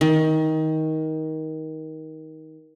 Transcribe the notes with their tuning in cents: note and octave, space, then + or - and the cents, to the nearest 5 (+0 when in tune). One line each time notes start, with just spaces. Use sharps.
D#3 +20